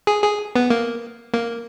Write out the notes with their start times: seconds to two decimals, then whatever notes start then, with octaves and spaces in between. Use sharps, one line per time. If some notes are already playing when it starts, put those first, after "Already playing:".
0.07 G#4
0.24 G#4
0.56 B3
0.70 A#3
1.34 A#3